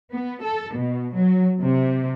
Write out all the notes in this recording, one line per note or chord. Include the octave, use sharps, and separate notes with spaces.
B3
A4
B2
F#3
C3